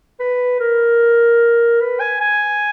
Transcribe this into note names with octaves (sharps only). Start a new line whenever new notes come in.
B4
A#4
B4
G#5
G#5